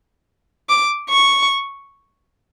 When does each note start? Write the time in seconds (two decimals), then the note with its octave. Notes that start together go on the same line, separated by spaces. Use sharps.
0.69 D6
1.10 C#6